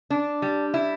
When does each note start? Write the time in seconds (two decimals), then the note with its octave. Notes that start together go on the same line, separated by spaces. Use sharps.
0.10 D4
0.42 G3
0.74 E4